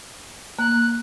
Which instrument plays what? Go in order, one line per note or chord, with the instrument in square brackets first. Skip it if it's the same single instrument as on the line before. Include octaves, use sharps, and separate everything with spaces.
[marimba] A#3 [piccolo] F#6